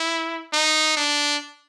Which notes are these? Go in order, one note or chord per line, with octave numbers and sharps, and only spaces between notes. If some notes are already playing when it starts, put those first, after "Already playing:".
Already playing: E4
D#4
D4